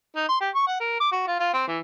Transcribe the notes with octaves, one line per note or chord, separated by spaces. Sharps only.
D#4
C6
G4
C#6
F#5
A#4
D6
F#4
F4
F4
C4
E3